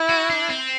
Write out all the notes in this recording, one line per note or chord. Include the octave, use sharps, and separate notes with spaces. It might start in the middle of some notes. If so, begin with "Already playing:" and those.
Already playing: E4
F#4
D4
C4